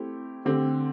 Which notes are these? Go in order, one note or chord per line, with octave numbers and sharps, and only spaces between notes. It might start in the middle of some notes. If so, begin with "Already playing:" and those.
Already playing: A3 C4 E4 G4
D3 A3 C4 G4